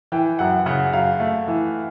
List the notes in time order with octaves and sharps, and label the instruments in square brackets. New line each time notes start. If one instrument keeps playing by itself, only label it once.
[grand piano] E3 [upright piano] G5
[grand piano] F#2 [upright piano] F#5
[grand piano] C#3 [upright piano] F#5
[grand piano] F#2 [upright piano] F5
[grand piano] A3
E3